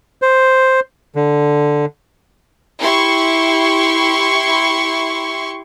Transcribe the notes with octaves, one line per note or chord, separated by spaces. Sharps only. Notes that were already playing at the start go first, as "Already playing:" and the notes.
C5
D3
E4 G4 C6 C#6